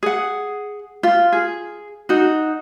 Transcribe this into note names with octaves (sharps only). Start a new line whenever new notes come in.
G#4 F#5
F4
G#4
D#4 F#4